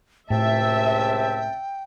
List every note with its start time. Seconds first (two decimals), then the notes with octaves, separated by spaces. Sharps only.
0.30 C#2 A2 C3 E5 G5 A5